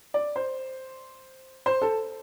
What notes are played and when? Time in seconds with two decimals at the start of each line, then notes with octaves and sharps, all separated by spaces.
0.14 D5
0.36 C5
1.66 C5
1.82 A4